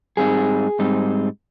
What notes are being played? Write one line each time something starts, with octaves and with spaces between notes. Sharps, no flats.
G#2 G3 C4 D#4 G#4
G#2 G3 C4 D#4